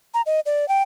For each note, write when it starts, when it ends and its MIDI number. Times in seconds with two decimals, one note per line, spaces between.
0.14 0.22 82
0.26 0.40 75
0.46 0.68 74
0.68 0.82 79